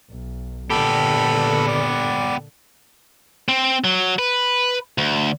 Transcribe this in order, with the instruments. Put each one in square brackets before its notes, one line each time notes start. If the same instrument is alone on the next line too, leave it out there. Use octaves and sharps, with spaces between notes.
[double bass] B1
[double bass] A#2 D3 [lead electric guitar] B3 G4 [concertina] A4 B5
[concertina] D5
[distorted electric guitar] C4
F#3
B4
D2